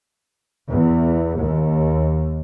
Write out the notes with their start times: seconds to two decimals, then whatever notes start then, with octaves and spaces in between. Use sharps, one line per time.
0.68 E2
1.37 D#2